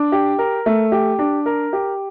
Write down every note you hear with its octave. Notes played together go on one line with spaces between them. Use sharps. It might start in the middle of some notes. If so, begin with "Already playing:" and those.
Already playing: D4
G4
A#4
A3
G4
D4
A#4
G4